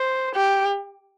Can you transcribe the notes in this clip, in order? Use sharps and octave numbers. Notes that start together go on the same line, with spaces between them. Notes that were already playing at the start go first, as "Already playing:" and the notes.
Already playing: C5
G4